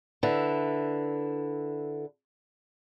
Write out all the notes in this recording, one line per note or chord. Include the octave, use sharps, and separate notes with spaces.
D3 E4 B4